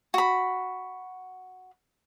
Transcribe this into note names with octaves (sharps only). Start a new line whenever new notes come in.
F#4 B5